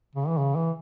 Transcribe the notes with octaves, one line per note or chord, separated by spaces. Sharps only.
C#3
E3
C#3
E3